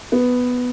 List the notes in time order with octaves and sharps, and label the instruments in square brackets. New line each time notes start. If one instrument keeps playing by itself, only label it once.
[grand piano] B3